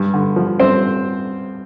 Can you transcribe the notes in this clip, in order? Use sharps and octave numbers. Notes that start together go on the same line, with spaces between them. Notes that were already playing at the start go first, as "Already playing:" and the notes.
Already playing: G2
D3
F3
G2 C4 C5